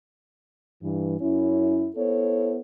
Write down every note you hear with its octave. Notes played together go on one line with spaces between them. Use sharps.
G2 E3
F#2 C#4 E4
B3 E4 A4 C5 C#5